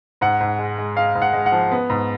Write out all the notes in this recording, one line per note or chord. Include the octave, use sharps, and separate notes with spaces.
G#2 F#5
G#2
G#3
G#3
G#3 F5
G#2
F#5
G#3
F#5
F3
B3
G#2